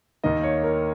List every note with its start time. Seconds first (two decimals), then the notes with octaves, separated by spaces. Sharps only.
0.24 D#2 D#3 A#3 D#5
0.43 C#5
0.63 A#4